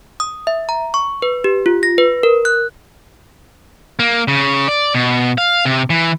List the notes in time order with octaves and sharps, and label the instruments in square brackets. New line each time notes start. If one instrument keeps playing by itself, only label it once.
[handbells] D#6
E5
A#5
C#6
B4
G4
F4
A#6
B4
A#4
F#6
[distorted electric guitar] A#3
C#3
D5
B2
F5
C3
E3